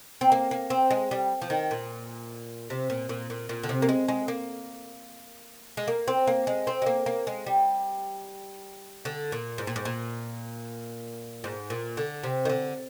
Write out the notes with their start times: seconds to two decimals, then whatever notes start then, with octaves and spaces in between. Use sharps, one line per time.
0.21 C4
0.32 A#3
0.51 A#3
0.70 C4
0.90 G#3
1.11 G3
1.42 F3
1.50 D#3
1.71 A#2
2.70 C3
2.90 A#2
3.09 A#2
3.30 A#2
3.49 A#2
3.63 D3
3.69 C3
3.82 A#3
3.89 G#3
4.08 G#3
4.28 A#3
5.77 G#3
5.88 A#3
6.08 C4
6.27 A#3
6.47 G#3
6.67 C4
6.82 G#3
6.86 A#3
7.06 A#3
7.27 G#3
7.46 G3
9.05 D3
9.32 A#2
9.58 G#2
9.67 A#2
9.76 G#2
9.85 A#2
11.44 G#2
11.70 A#2
11.97 D3
12.23 C3
12.45 D#3
12.49 D3